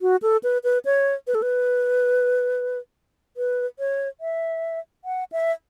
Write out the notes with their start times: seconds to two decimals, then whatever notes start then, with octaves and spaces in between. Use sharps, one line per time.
0.02 F#4
0.22 A4
0.43 B4
0.64 B4
0.85 C#5
1.27 B4
1.35 A4
1.42 B4
3.37 B4
3.79 C#5
4.21 E5
5.05 F#5
5.32 E5